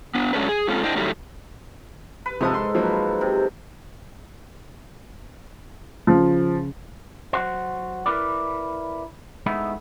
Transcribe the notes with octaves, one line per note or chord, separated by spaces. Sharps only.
B3 D4
F#3 G#3 A3 C#4 D4 B4
G#4
G#3 C4 C#4 F4 A4
D4 E4 C5 D#5 G5
A2 D#3 F#3 G3 A3
B4
G#2 C3 F3 A4 D#6
C6
F3 F#3 A#3
C3
C#3 F3
F#3 F#4 C5
E4 A#4 B4 D5
G#3 A3 B3 D#4 E4